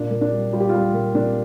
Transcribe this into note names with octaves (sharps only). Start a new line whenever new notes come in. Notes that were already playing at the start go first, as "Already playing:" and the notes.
Already playing: A#2 D4
A#2
D4
G3
G3 F4
G4
G3 F4
A#2
A#2 D4